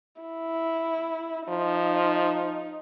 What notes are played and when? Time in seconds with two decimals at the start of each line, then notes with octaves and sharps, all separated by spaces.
0.21 E4
1.49 F3 D#4